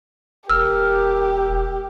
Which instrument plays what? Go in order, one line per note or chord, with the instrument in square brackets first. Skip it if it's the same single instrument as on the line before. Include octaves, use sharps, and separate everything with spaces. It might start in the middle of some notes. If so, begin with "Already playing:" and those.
[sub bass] E1 [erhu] G4 [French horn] A#4 [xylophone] E6 F6